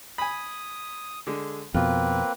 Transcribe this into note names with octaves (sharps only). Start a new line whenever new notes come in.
G#5 B5 D#6
D3 G#3
F2 B2 A#3 C4 F4 B4